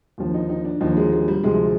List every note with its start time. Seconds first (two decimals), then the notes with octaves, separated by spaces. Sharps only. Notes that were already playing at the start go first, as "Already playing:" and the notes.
0.18 D#2 D3 F3
0.34 D#4
0.49 D#4
0.65 D4
0.81 D#2 D3 F3 D#4
0.97 G#3
1.12 G#3
1.28 G3
1.44 D2 C3 F3 G#3